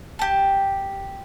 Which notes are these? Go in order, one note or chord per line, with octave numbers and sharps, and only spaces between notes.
G4 A5